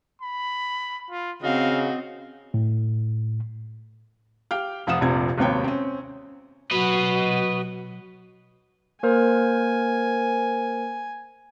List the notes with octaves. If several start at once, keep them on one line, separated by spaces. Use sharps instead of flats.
B5
F4
C#3 C4 F#4 D#5 F5
A2
G4 F5 G5 F6
F1 F3 F4 F#5 D#6 E7
F1 A#1 C3 G#6
G#1 D#2 C3 B3 C#5 G5
C4 C#4
B2 F#3 F#4 B4 D#5
A#3 A#4 C5 G#5